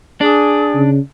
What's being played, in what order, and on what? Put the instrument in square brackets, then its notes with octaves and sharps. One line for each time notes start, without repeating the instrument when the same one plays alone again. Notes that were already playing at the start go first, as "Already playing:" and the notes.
[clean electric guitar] D4 [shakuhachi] G#4
[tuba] C#3